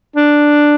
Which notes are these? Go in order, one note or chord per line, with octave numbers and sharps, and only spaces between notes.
D4